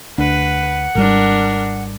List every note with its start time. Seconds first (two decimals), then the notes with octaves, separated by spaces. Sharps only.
0.18 D2 D4 B4 F#5
0.95 G#1 G3 D4 A#4